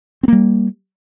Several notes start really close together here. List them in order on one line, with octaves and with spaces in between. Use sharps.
C4 A#3 G3